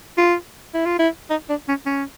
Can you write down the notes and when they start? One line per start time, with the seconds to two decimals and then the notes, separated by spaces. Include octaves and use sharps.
0.18 F4
0.74 E4
0.86 F4
0.99 E4
1.30 D#4
1.49 D4
1.68 C#4
1.86 C#4